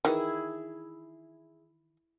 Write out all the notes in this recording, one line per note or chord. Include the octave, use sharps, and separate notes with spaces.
D#3 E3 E4 G#4